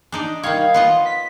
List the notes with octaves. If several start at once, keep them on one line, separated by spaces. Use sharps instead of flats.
D4 D#4 D5
D#3 G3 C#5 F5
B3 F4 D#5
B6